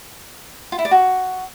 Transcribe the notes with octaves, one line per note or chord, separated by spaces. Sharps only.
F4
E4
D5
F#4